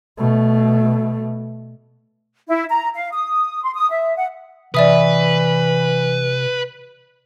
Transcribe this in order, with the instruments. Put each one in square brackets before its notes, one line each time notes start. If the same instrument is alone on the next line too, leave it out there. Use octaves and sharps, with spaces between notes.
[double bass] B2 A3
[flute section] E4
A#5
F5
D#6
C6
D#6
E5
F#5
[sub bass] C3 [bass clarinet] E3 [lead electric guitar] B4 [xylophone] D5 E5 D#6